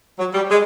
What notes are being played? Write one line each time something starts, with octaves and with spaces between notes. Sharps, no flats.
F#3
G3
G#3